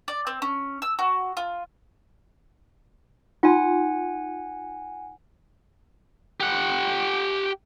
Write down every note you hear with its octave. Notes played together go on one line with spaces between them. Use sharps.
D5
C4
C#4
E6
F#4
F4
D#4 F4 F#5 G#5 C6
G4 F#5